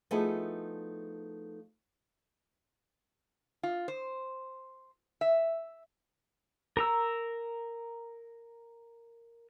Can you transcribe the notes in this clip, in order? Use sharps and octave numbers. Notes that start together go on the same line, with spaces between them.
F3 A3 B3 D#4 E4 G#4
F4
C5
E5
A#4 A#5 E6